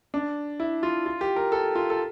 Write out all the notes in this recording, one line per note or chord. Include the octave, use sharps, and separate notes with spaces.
D4
E4
F4
F4
G4
A#4
A4
F4
A4